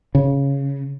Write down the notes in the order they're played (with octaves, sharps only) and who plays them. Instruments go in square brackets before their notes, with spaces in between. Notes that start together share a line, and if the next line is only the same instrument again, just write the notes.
[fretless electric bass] C#3